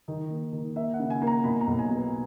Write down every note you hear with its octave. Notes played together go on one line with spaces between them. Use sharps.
D#3 D#5
A#3
D#3
A#3 E5
F#5
C#3
G#5
A#3
A#5
B2 B5
A#5
B1
G#5
B2
B4